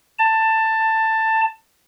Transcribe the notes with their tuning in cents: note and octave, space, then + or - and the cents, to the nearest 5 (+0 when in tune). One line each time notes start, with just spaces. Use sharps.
A5 +15